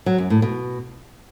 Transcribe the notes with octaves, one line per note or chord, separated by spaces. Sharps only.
F#3
F#2
A2
B2